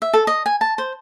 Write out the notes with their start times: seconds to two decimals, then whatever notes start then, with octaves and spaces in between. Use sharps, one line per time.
0.02 E5
0.14 A4
0.27 D#5
0.46 G#5
0.61 A5
0.78 C5